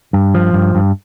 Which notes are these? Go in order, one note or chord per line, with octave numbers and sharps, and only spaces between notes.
G2
F3
G2
G2